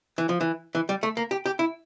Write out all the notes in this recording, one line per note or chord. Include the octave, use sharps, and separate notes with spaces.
E3
F3
E3
E3
G3
A3
A#3
G4
G4
E4